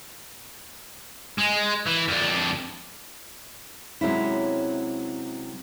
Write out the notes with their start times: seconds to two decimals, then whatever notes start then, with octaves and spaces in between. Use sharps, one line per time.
1.38 G#3
1.86 E3
2.08 F2 D4
4.01 C3 F#3 G#3 C4 C#4 E4